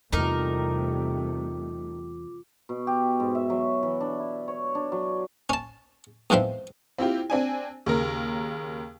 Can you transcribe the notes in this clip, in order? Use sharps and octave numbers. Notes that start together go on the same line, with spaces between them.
E2 C3 G3 A3 D#4 F4 A#4 D6
B2
G4
G#2
E5
F#3
E3
D4
E4
C#5
D4
F#3
C#4 A5
E2 G#2 F3 C4 E5
C4 E4 F4 G4
C4 D4 G#5
D#2 C#3 A#4